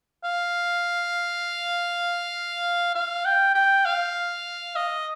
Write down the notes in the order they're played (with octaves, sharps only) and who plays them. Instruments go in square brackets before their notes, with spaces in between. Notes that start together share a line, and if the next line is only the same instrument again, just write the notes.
[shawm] F5
F5
G5
G5
F5
D#5